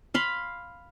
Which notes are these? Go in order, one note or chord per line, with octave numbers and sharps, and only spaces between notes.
F5 B5 C6